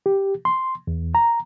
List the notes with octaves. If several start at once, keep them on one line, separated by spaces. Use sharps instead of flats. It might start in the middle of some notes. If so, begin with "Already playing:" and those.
G4
C6
E2
A#5